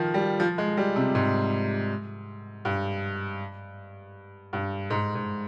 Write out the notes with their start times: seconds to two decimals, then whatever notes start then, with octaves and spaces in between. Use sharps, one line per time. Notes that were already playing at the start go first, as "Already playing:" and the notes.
Already playing: D#3 F3
0.14 G3
0.40 F3
0.58 G#3
0.77 G3
0.96 C3
1.15 G#2
2.65 G2
4.53 G2
4.90 G#2
5.15 G#2